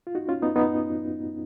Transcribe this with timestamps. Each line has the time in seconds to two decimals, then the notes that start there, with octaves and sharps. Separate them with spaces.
0.07 F4
0.15 D#4 F#4
0.29 C#4 F4
0.42 B3 D#4
0.56 B3 D#4